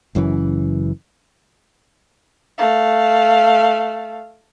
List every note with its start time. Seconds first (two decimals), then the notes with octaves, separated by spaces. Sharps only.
0.15 F#1 F#2 C#3 E3
2.58 A3 F5